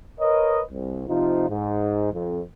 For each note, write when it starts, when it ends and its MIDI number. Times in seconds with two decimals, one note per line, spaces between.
0.20 0.61 70
0.20 0.61 71
0.20 0.61 73
0.20 0.61 75
0.71 1.03 36
1.08 1.48 48
1.08 1.48 53
1.08 1.48 63
1.08 1.48 65
1.49 2.10 44
2.13 2.41 41